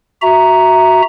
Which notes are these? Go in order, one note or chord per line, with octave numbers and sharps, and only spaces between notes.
F#4 E5 A#5